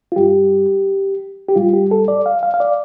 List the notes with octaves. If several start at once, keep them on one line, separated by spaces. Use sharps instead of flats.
F4
G2 G3 G4
G4
A2 G3 F4
G4
A4
D5
F5
F5
F5
D5